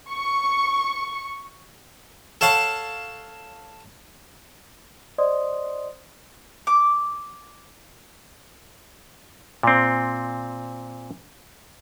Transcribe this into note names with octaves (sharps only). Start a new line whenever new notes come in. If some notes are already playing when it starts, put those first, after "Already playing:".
C#6
A4 C#5 F5 F#5 A5
C5 D5 D#5 C6 D#6
D6
A#2 C4